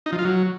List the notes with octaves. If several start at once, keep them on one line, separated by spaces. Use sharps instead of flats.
D#4
F3
F4
F#3